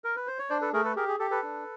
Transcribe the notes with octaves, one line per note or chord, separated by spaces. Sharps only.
A#4
B4
C5
C#5
D4 C5 D5
A4 B4
A3 G#4 A#4
A4 B4
G4 G#4 A#4
G#4
G4 A4
A4 B4
D4